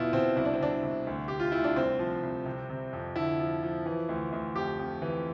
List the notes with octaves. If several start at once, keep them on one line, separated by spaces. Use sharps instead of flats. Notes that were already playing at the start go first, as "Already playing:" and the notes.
Already playing: E2 B2 E4 F4
B2 C4
C2 E4
D4
C4
C2 D4
C2
D2
D2 G4
F4
D2 E4
D4
C2 C4
F3
C2
C3
C3
F2
D3 E4
F3
F3
E3
D2
D2
F2 G4
F2
E3